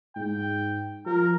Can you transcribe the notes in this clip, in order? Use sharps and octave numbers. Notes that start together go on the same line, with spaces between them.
G#2 G5
F3 A#4